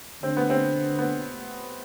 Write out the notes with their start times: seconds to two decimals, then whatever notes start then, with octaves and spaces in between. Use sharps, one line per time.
0.23 D3 C4
0.37 B3
0.50 C4
0.99 B3